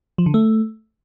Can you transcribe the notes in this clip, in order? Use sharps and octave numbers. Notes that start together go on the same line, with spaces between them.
F3
D3
A3